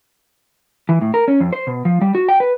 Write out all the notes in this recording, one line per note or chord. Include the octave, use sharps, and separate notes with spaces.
E3
A2
A#4
C#4
F2
C5
B2
F3
G3
F#4
G5
B4